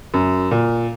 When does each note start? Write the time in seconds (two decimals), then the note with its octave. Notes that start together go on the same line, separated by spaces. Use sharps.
0.14 F#2
0.51 A#2